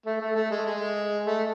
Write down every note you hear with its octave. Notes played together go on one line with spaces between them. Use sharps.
A3
A3
A3
G#3
G#3
A3